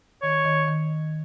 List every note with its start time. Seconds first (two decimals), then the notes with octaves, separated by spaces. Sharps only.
0.22 D#3 C#5
0.45 D#3
0.68 D#3